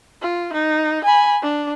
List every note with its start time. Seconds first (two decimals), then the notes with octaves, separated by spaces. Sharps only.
0.21 F4
0.53 D#4
1.04 G#5 B5
1.42 D4